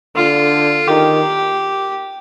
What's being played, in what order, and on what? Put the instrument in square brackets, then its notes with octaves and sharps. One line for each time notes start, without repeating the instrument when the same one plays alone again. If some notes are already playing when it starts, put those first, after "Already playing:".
[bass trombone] D3 [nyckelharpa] F4
[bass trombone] D#3 [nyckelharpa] G4